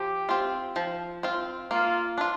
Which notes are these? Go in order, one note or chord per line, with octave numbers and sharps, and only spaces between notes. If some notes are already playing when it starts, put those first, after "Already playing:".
Already playing: F3 G4
C4 F4
F3
C4 F4
A#3 F4
D4 F4